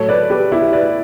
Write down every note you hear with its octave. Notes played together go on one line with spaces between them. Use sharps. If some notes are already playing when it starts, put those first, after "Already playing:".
Already playing: A2 F#3 A4 C#5
B4 D5
G4 B4
E4 G4
B4 D5